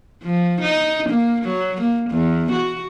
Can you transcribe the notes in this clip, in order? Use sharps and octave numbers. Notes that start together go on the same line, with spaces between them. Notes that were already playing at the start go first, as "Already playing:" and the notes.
F3
D#4
A#3
F#3
A#3
E2
F#4